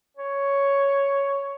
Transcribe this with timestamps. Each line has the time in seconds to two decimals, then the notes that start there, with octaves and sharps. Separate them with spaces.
0.17 C#5